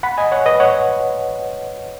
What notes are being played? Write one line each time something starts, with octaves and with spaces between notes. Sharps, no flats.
F#5 B5
D#5 G#5
C#5 F#5
B4 D#5
C#5 F#5